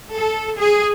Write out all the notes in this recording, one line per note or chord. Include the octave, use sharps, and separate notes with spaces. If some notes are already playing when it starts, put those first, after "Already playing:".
A4
G#4